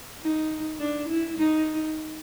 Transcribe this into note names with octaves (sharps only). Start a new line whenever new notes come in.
D#4
D4
E4
D#4